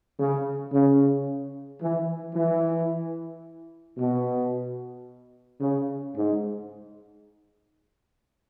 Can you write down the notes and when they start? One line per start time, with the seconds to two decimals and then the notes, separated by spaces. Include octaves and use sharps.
0.18 C#3
0.72 C#3
1.81 E3
2.35 E3
3.98 B2
5.61 C#3
6.15 G#2